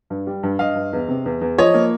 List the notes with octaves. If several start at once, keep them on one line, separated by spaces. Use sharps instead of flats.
G2
G3
G2
G2 D#5 F5
G2
E2
C3
E2
E2
F3 C#5 D#5
A#3